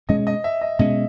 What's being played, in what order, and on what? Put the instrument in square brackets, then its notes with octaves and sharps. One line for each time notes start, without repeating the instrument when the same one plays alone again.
[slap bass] B2 G#3 C#4 [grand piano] D#5
[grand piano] D#5
E5
D#5
[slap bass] B2 G#3 C#4 [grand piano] D#5